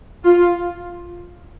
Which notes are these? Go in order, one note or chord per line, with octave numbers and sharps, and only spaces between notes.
F4